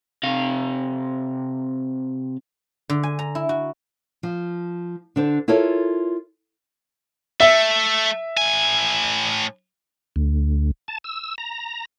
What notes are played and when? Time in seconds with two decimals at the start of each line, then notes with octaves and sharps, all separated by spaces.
0.23 C3 F5
2.90 D3
3.03 G#5
3.19 A#5
3.35 E4
3.49 F#4
4.23 F3
5.16 D3 D4 C5
5.48 E4 F4 A4 A#4 C#5
7.40 A3 E5
8.37 A2 G#5
10.16 D2
10.88 A5
11.04 E6
11.38 A#5